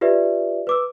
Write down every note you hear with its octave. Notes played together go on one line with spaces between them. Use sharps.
F4 G4 B4 D5 E5
B4 D6 E6